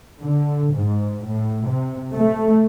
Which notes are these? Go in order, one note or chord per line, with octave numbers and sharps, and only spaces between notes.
D3
G#2
A2
C3
A3